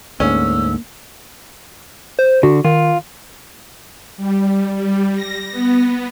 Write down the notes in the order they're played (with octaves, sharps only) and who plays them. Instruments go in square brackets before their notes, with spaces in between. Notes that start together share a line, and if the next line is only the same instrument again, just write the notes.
[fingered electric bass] D2 G#2 [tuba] A#3 [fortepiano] C#4 [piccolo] E6
[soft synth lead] C5
[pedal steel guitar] D3 [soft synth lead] F#4
[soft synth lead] D#3 [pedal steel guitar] F4
[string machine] G3
G3
A#6
B3